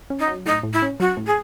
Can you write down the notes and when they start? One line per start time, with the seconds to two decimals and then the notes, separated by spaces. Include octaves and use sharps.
0.10 C#4
0.19 D#4
0.27 F#3
0.46 A2 D#4
0.63 A2
0.73 E4
0.82 C#4
1.00 F#3 F#4
1.17 A2
1.26 G#4